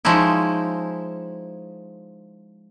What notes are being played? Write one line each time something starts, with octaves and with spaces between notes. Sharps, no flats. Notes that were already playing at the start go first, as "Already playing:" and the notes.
F3 G#3 C#4 D#4 E4